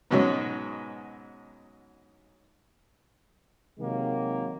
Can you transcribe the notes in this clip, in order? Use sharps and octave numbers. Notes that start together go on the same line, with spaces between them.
G#2 B2 F#3 G#3 C#4
C3 D#3 F#3 G#3 A#3